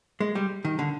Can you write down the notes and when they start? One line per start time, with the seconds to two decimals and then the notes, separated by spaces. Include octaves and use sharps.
0.20 G#3
0.35 G3
0.65 D#3
0.79 D3